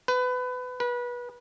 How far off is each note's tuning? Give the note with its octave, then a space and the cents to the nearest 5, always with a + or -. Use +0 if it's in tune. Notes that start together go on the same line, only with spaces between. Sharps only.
B4 +25
B4 -25